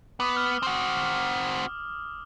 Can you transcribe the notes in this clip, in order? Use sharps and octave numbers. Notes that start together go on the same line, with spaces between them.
B3 D6 D#6
F6
C4 F#4